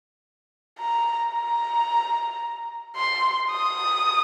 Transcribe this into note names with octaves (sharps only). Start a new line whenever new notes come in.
A#5
A#5
C6
D#6